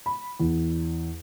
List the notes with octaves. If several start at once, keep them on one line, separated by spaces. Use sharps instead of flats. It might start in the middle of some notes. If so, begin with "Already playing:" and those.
B5
E2